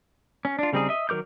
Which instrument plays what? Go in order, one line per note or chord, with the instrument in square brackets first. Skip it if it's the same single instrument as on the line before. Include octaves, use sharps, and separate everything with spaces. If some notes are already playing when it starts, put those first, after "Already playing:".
[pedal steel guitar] C#4
D4 F4
C#3 G3 C4 D#4 G#4
D#5 E5
D#3 F#3 A#4 D6 G6